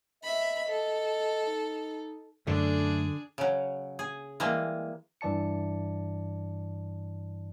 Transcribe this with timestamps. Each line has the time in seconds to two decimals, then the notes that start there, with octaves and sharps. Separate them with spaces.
0.23 D#5 E5 B5
0.69 A4
1.48 D#4
2.47 F#2 D3 A3 D4 G#4
3.38 C#3 F#3
3.99 G#4
4.40 E3 G3 G#3 A#3
5.21 G2 E3 D5 A5 C#7